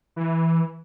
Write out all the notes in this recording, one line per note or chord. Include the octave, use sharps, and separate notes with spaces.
E3